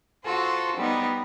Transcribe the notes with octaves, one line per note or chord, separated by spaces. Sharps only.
F4 F#4 A4 C5
G3 B3 D#4